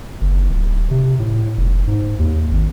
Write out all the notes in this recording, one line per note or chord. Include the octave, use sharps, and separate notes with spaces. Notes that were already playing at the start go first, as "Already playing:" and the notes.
F#1
D1
C3
A2
F1
G#2
D#2
G#1